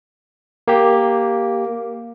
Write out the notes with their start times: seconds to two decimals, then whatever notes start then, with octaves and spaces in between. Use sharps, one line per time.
0.68 A#3 G4